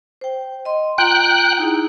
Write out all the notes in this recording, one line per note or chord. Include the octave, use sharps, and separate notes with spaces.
C5 G5
D#5 C6
F4 G5 A#5 F#6
D#4 E4 G#4